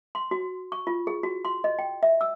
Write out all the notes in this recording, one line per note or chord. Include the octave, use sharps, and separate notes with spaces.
C6
F#4
C#6
F4
G#4
F#4
C6
D#5
G5
E5
E6